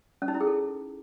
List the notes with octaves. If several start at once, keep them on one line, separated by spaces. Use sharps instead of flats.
C#4
D#4
E4
G#4
A4